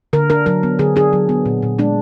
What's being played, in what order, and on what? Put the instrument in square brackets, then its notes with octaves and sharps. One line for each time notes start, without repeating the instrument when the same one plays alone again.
[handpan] D3 A#4
D4 A#4
F#3 A#4
B3
D3 G#4
D4 G#4
F#3
B3
A#2
A#2
G#3 D4